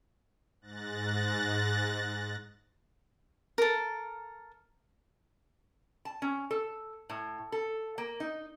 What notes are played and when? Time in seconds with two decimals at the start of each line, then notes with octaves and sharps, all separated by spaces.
0.61 G#2 F#6 A6 A#6
3.58 A4 A#4
6.05 A5
6.22 C#4
6.51 A4
7.10 A2
7.52 A4
7.98 A#3
8.20 D#4